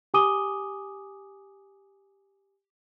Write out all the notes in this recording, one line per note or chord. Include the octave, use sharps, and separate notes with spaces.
G4 G#5 D6 D#6 D#7 G7